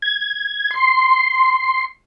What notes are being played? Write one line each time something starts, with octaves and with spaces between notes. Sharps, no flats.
G#6
C6